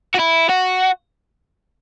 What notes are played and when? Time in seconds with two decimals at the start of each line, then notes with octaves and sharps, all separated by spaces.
0.15 F#4
0.20 E4
0.50 F#4